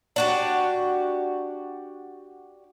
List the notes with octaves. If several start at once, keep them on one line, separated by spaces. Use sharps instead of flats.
D4 F#4 G4